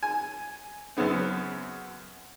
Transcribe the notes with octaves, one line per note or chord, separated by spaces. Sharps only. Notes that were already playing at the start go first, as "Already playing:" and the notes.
G#5
F#2 C#3 B3 C4